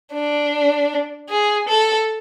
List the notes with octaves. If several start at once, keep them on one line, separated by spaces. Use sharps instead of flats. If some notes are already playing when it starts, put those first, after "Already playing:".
D4
G#4
A4